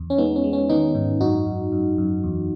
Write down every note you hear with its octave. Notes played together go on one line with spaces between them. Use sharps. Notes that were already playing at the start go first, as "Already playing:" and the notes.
Already playing: E2
C#4
G#3 B3 D#4
C#4
G#3
C#4
D#3 B3 D#4
G#2
F#2 D#4 F#4
F#2
F#2
F#2
E2